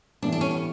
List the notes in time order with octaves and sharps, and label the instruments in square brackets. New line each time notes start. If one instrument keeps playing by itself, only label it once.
[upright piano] A2 E3 G3 B3 [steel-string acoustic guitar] D4
[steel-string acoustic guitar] D4
C#4
B3